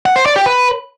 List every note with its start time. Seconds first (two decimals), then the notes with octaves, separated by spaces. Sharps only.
0.06 F#5
0.16 C5
0.26 D5
0.36 G4
0.46 B4